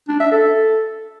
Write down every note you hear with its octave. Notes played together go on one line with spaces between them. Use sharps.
D4
E5
A4